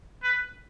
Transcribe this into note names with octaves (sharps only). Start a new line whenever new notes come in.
B4